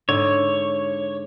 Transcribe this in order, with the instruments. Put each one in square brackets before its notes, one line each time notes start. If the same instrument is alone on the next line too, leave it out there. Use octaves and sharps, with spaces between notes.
[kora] G#2 D3 [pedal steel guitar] C#5